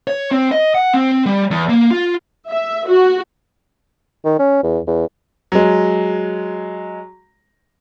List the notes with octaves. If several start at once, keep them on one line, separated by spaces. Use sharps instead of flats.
C#5
C4
D#5
F#5
C4
G3
E2
A#3
F4
E5
F#4
D#3
C#4
E2
E2
F#3 G#3